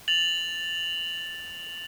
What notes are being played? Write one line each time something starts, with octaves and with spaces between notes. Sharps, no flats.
A6 F7 F#7